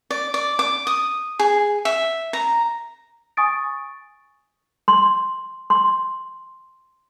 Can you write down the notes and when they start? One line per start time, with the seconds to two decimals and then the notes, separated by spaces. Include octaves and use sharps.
0.10 D5
0.34 D5
0.59 D6
0.87 D#6
1.39 G#4
1.85 E5
2.33 A#5
3.37 G#5 C#6 D#6 A6 D7
4.88 C6
5.70 C6